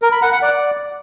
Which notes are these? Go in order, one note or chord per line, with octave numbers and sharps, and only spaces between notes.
A#4
B5
F#5
F#5
D5